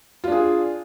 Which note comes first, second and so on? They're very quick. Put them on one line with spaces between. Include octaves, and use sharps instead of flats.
F4 D4 G#4